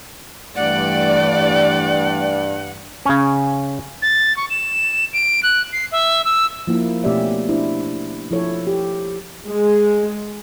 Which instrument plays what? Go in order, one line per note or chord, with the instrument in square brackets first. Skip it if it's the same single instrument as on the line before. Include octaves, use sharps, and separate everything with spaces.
[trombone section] G2 [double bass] E3 A3 [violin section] D5 [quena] F#5
[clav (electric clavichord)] C#3 C#4
[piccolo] A6
C#6
E7
D7
F#6
C7
E5
E6
[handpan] F3 A#3 E4
B2 A3 C#4 G4 D5 E5
D4 E4 C5
F3 E4 A4 C#5
G4
[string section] G#3